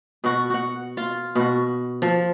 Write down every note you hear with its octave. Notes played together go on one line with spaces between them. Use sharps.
B2 F#4
F#4 F#5
F4
B2 F#4
F3